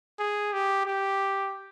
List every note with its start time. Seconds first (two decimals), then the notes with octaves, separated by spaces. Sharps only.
0.19 G#4
0.53 G4
0.86 G4